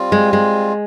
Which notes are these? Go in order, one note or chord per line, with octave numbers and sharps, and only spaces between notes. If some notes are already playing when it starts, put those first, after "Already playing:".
Already playing: G3 C4 F4
G#3
G#3